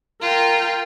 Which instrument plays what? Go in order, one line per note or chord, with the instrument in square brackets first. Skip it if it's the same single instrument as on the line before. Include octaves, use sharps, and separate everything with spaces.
[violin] F4 [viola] A#4 G5